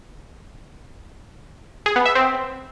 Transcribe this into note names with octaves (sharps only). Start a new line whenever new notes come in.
G#4
B3
E5
C4